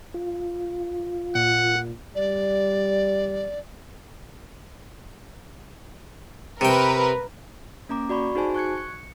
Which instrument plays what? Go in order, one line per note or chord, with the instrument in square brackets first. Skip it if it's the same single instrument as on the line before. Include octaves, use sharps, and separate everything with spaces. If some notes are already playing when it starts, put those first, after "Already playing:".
[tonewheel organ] F4
[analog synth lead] A#2 [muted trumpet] F#5
[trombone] G3 [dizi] D5
[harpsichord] C3 G5 [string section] A#4 B4
[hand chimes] A#3 C#4 A#5 D6
F#4 D5 B5 C#6
D#4 F#4 G#4 C5 G#5 A5
C#6 F#6 G#6 C#7
C#7